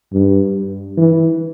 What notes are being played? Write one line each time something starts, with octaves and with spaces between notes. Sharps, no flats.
G2
E3